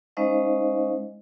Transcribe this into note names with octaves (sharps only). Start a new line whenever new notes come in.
G#3 C#4 D#4 C5 D#5 F5